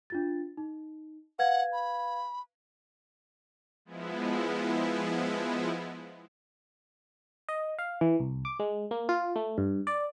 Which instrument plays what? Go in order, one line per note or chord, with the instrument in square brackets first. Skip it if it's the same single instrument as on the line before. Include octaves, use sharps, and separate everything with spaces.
[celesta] D4 F4 A6
D#4
[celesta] B4 F5 G#6 [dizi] F#5
[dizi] B5
[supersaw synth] F3 G#3 B3 E4
[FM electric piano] D#5
F5
E3
C2
D6
G#3
A#3
F4
A3
G2
D5